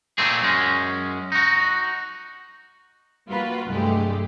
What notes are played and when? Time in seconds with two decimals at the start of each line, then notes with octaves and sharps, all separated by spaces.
0.18 A#2 A3 C4 G#4
0.42 F#2 G#3 C#4
1.32 D#4 F#4
3.27 G3 A#3 F4 F#4 B4
3.68 C2 G2 F#3 G#3 A3 G4